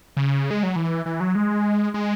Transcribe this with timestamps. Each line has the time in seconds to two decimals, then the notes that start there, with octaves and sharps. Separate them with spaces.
0.17 C#3
0.51 G#3
0.63 F#3
0.76 E3
1.06 E3
1.20 F#3
1.35 G#3
1.94 G#3